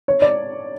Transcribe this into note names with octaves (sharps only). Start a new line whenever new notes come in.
C#5
D5